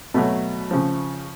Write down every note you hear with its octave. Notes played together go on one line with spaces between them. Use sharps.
B2 F#3 A3
C#3 F3